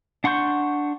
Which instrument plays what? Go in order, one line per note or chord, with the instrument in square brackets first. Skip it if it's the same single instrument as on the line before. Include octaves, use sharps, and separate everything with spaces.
[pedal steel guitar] D4 F#5 C6 C#6 G6